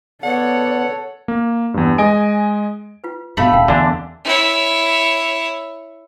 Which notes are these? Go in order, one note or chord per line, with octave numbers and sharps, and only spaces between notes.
B3 A4 C#5 D5 F#5
A#3
E2 G2
G#3 D#5 G#5 D7
F4 B4
G2 B2 A3 G#4 A4 F5 B5
D#1 A#4 F5 G5
E2 D3 D4 F#4 G#5 E6
E4 C#5